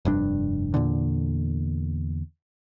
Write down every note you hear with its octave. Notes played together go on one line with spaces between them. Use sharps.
F1 G2 D4
E2 A#2 D3